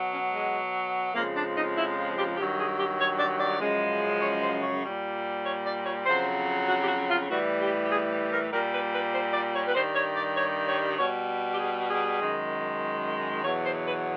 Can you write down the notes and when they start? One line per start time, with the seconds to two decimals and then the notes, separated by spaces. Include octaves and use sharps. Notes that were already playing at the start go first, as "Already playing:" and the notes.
Already playing: B2 F#3
0.12 C#4
0.32 G#3
1.14 F2 C#3 F3 G#3 A#3
1.35 D4
1.55 D#4
1.76 E4
2.17 G4
2.37 G2 D#3 F#3 G4
2.58 G#4
2.78 G4
2.98 C#5
3.19 D5
3.40 D5
3.60 F#2 C#3 F3 G#3
4.22 C#5
4.43 C5
4.62 C#5
4.83 A#2 G3
5.44 C#5
5.65 D5
5.85 C#5
6.05 F2 C#3 F#3 C5
6.67 F#4
6.82 G4
6.87 F#4
7.09 F4
7.29 A2 E3 G3 F#4
7.60 G4
7.86 G4
7.90 G#4
8.31 A#4
8.51 A#2 G3 A#4
8.73 B4
8.93 B4
9.13 C5
9.33 D5
9.54 C#5
9.67 B4
9.75 G2 D#3 G3 C5
9.95 C#5
10.15 D5
10.36 C#5
10.67 C#5
10.98 B2 G3 C#5
11.53 G4
11.59 G#4
11.90 G#4
12.21 F#2 D#3 G#3
13.43 E2 B2 F#3 C#5
13.64 C5
13.85 B4